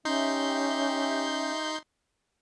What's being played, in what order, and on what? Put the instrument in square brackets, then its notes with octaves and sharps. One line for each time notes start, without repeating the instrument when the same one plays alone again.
[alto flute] C#4 [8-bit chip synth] D#4 C6 G6 [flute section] G4 E5